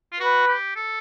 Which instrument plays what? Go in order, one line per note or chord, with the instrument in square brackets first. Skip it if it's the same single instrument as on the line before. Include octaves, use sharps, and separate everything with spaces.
[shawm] F4
[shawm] F#4 [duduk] B4
[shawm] G4
A4